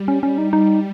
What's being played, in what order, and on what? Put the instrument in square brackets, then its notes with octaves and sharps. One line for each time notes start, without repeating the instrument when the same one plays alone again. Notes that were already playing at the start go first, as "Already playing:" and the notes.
Already playing: [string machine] G3
[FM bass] C#4
C#4
D#4
[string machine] G3 [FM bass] D#4